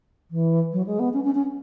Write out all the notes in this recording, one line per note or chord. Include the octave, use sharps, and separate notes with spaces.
E3
F#3
G#3
B3
C#4
C#4
C#4